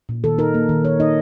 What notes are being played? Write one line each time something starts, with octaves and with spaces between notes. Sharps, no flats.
A#2
D#3 A4
D#4 A#4
A#3
D#3
D#3 C#5
D#4 D#5